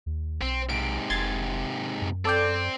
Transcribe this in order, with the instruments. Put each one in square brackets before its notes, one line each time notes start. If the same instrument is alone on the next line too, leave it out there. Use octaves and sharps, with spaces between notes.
[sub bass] D#2
[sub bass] B1 [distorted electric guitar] C4
[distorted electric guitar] G#2 C3 [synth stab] D7
[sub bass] F1 [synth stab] C6 G#6 A6
[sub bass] F#2
[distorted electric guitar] C4 [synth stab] A4 D5 G5